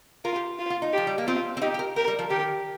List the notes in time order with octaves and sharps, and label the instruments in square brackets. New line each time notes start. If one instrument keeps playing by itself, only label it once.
[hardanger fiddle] F4 [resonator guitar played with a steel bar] A#4
[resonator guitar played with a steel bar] G4
[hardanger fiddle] F4
[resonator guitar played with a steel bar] F4
D#4
[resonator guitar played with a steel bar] F3 [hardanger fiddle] G4
[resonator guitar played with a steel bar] G3
A#3
[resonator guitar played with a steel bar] C4 [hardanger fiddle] F4
[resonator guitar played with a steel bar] C4
[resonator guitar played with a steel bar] D#4 [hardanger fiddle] G4
[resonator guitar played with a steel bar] G4
A#4
[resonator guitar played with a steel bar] G4 [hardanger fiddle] A#4
[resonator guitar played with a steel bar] G3
F3
[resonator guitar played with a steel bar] D#3 [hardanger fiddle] G4